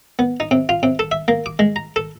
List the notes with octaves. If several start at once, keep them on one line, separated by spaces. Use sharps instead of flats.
B3
D#4
C3
F4
C3
A4
E5
A#3
D6
G#3
A#5
A4